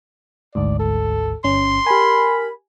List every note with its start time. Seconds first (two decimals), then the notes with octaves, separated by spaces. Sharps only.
0.55 G#1 D2 G#2 D5
0.80 A4
1.44 G1 C#4 C6
1.87 G4 A#4 G#5 B5